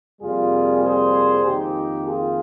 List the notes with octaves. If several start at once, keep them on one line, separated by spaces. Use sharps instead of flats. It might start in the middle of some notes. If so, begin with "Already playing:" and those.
F2 C3 G3 A#3 F4 G#4
G#4 C5
F2 D#3 A#3 D#4 G4
F4 G#4